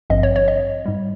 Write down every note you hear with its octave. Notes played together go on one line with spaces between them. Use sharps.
G#1 G2 F3 C4 D#5
C#5
C#5
D#5
G#2 G3